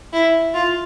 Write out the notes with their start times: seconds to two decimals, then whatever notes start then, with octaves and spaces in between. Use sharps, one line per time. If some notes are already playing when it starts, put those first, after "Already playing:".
0.13 E4
0.54 F4